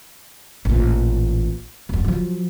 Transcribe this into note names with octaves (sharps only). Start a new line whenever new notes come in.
A1 A#2
D1 F#2
F3 F#3